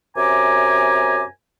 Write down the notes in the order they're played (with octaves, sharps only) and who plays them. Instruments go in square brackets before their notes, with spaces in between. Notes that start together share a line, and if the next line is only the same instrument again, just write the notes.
[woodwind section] F#2 C3 G#5 A#5 D6